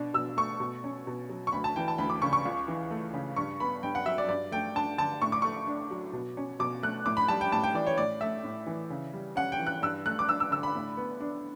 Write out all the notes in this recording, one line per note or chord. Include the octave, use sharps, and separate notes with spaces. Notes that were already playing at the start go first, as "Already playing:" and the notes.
Already playing: B2 D4
B2 E6
A3 C#6
B2
C#4
B2
F#3
C#6
D2 B5
A5
E3 G5
A5
D2 B5
D6
C#3 C#6
C#6
C#2
E3
A3
C#3
G2 C#6
B3 B5
G2 G5
F#5
F#3 E5
D5
G2 D5
A3 G5
D4 A5
D3 A5
A2 C#6
D6
A3 C#6
D4
F#3
B2
C#4
B2 D6
A3 F#6
A2 D6
B5
G3 A5
G5
A2 A5
G5
E3 D5
C#5
A2 D5
A3 E5
A2
E3
C#3
G3
C#4 F#5
G5
E3
F#6
G2 E6
A3 F#6
D6
D4 E6
E6
D3 E6
B5
A2
B3
D4